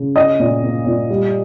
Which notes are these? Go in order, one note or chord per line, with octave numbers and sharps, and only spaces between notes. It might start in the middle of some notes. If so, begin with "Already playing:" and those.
Already playing: C#3
C#4 D#5
A#2
A#3
A#2
G3